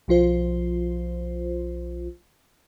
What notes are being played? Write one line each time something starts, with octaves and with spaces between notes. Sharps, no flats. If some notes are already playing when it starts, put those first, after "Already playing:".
B1 F3 F4 C5